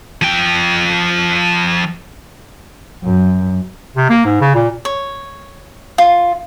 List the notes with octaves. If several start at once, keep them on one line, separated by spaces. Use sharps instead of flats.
F3 G5
F#2
C3
A#3
G#2
C#3
A#2
C#5
F4